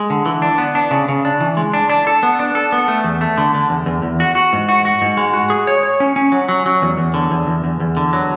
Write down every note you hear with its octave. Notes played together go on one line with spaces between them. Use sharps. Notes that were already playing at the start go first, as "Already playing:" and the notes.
Already playing: G#3
D3
E3
D4
B3
D4
C#3
C#3
D4
E3
G#3
D4
D4
A4
B3
D4
A4
B3
A3
E2
A3
D3
D3
E2
E2
E2
F#4
F#4
G#2
F#4
F#4
G#2
G#3
F#4
G#4
C#5
C#5
C#4
C#4
F#3
F#3
F#3
E2
E2
D3
E2
E2
E2
E2
D3
F#3